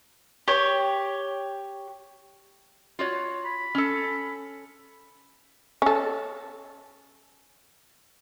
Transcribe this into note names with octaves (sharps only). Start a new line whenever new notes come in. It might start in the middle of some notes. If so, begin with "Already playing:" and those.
G4 C#5
F4 F#4 C#5
B5
C#4 A4
C#4 A4